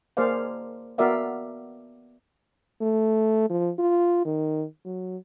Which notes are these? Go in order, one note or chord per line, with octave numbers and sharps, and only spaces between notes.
A#3 G#4 C5 D5 F5
B3 F#4 A#4 D5 E5 F5
A3
F3
F4
D#3
F#3